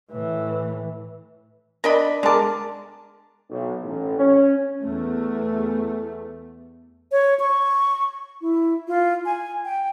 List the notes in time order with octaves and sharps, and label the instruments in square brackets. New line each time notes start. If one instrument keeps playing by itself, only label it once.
[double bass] A2 E3
[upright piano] D4 D5 [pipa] A#4 D#5 B5
[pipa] D3 A5 [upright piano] G#3 A#4 D6
[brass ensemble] B1
A1
C#4
[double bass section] E2 A3
[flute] C#5
C#6
E4
F4
G#5
G5